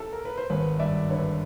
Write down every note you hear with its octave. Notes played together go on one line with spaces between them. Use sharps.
A4
A#4
B4
C5
G#1 B4 C#5
G2 D5 E5
D3 B4 C#5